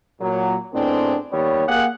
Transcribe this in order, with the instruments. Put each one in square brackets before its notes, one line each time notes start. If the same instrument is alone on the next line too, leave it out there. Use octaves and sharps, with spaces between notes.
[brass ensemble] A#2 F#3
A2 D#3 G#3 B3 C4 D4
D#2 G3 B3 C#5
A#3 G4 G#4 F5 F#5